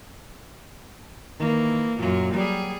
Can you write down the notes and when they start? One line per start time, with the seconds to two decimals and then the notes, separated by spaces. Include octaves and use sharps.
1.40 D#3 E3 A#3
1.99 F#2 A#2 F#3 A#3 F4
2.34 F#3 G3 G#4 G5